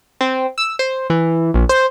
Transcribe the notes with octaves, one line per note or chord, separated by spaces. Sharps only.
C4
E6
C5
E3
A#1
C5